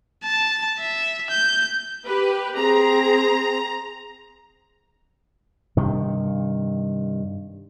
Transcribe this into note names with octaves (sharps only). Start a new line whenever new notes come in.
A5
E5
G6
G4 B4
C4 G#4 A#5
G2 C3 D#3